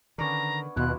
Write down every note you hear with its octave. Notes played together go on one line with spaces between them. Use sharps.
D3 D#3 B3 C#4 D4 A#5
D#2 B2 E4 F4 F#6